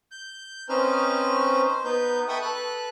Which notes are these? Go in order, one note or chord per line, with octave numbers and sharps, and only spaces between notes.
G6
C4 C#4 D#4 B4 C5 F6
C5
B3 D#4 B4 G6
A4 B4 E5 G5 C#6 D#6
A4 B4 F#6